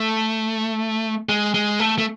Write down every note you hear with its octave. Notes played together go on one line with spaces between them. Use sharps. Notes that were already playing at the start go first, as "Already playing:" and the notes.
Already playing: A3
G#3
G#3
A3
A3